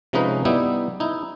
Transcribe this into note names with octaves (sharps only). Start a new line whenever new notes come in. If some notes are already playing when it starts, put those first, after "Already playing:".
C3 F3 G#3 C#4 D#4 B4
G3 B3 D#4 E4 G4
D#4 E4